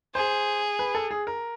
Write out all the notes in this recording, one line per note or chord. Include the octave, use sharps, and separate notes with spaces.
G#4 C5
B4
A4
G#4
A#4